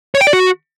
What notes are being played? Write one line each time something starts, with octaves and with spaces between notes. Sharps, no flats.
C#5
G5
D5
F#4